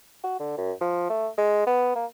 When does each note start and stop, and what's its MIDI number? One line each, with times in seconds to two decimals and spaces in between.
0.24 0.39 66
0.40 0.55 50
0.58 0.72 42
0.81 1.09 53
1.10 1.27 57
1.38 1.63 56
1.67 1.93 59
1.96 2.05 58